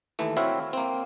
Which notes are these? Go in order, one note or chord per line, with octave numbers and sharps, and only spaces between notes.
D#2 E3 A3
C4 E4 F#4 C#5 E5 F5
A#3 C4